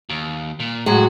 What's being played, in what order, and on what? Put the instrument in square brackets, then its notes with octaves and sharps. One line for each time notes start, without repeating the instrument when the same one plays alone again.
[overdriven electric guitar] D#2
A#2
[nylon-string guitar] A2 F#3 G#3 [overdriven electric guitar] F#4